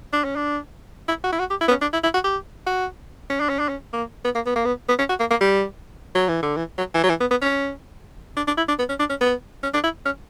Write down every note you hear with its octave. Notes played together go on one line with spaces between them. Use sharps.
D4
C#4
D4
E4
F#4
E4
F#4
G4
E4
B3
C#4
D4
E4
E4
F#4
G4
F#4
C#4
D4
C#4
D4
C#4
A#3
B3
A#3
B3
A#3
B3
B3
C#4
F#4
A#3
A#3
G3
F#3
E3
D3
E3
F#3
E3
F#3
E3
B3
B3
C#4
D4
D4
E4
D4
B3
C#4
D4
C#4
B3
C#4
D4
E4
C#4